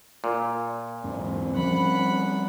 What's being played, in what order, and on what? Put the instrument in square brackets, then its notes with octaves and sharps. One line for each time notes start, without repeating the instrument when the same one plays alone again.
[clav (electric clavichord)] A#2
[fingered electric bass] E2 G#2 [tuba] C4
[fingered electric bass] F3 G3 C#4 [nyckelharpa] F#5 B5